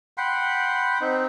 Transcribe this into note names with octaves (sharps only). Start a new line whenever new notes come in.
F#5 G5 B5 C6
C4 D#4